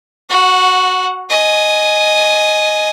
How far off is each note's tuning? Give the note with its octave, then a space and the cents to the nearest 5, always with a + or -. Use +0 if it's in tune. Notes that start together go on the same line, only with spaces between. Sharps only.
F#4 +0 F#5 -20
D#5 -5 G#5 +15